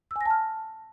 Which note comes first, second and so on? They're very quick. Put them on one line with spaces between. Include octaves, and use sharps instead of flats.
E6 G#5 A#6 A5 F6